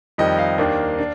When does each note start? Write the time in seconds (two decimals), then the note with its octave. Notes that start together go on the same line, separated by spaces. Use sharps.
0.18 F2 D#3 G3 D#5
0.39 F5
0.58 D#2 D#3 A#3 D4
0.99 D4